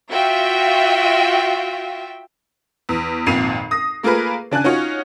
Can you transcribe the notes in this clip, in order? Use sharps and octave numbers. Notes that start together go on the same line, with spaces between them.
F4 F#4 E5 G5
E2
G#1 F2 A#2 C7 D#7 F7
D#6 A#6
A3 A#3 F4 G#4 A#4 B4
C#3 D4 G#5 F#6
C#4 D#4 F4 F#4 C#5